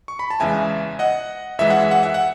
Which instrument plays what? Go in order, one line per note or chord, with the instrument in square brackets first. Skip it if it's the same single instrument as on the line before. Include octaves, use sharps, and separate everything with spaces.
[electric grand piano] C#6
B5
A5
E2 C#3 E3 G#3 E5 G#5
D#5 F#5
F#2 E3 G#3 E5
F#5
E5
F#5
E5
F#5